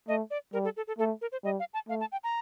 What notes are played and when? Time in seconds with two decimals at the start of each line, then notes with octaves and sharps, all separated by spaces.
0.08 A3 D#5
0.30 D5
0.53 G3 A#4
0.64 A4
0.77 A4
0.87 A4
0.99 A3 A4
1.21 A#4
1.32 C5
1.44 G3 D#5
1.60 F5
1.73 A5
1.89 A3 F5
2.00 A5
2.12 G5
2.24 A#5